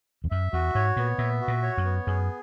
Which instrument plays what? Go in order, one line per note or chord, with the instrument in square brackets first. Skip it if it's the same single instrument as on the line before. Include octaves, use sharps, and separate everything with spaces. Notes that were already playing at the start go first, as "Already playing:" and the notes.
[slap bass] E2
[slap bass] F#2 [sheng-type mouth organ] E5
[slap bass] E2 [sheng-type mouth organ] F#4
[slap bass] G#2 [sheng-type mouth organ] C#5
[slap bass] A#2 [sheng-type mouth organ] B3
[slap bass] A#2 [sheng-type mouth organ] E5
[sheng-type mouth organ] F#4
[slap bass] A#2
[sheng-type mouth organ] C#5
[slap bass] F#2
[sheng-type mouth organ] B3
[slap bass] F#2 [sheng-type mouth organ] G#4